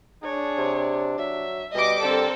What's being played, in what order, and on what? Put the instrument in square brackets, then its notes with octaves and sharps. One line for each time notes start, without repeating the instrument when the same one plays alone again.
[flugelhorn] D4 [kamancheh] G#4 C#5
[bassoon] C3
[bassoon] F#3 [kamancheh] E5
[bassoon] B2 [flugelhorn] G3 [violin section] D#5 D6
[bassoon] D3 [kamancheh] C4 A#4 [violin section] A4